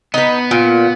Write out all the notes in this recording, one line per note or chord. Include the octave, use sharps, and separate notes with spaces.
B3 D#4 B4
A#2 F4